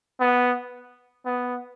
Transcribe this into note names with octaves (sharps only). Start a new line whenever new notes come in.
B3
B3